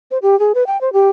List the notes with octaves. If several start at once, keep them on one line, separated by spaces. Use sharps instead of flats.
C5
G4
G#4
B4
G5
C5
G4